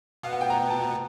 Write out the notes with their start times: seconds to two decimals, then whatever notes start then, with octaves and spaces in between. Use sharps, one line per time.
0.23 B2 B3 F5
0.33 F#5
0.41 G5
0.50 A#5
0.70 A5
0.82 A#5